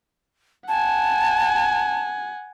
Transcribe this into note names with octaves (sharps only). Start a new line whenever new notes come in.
F#5 G#5 A5